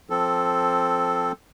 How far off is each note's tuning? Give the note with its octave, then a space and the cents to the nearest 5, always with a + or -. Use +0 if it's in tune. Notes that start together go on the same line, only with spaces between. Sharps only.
F3 +0 C4 +0 A4 +0